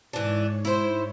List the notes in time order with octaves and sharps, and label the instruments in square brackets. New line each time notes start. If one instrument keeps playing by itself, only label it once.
[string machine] G#2 C#5 [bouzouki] E3 D4
[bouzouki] E4 C5